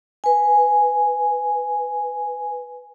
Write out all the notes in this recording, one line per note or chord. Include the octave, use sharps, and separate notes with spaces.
B4 G#5